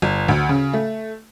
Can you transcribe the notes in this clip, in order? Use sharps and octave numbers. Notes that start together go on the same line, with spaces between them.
G1
D2
C#3
A3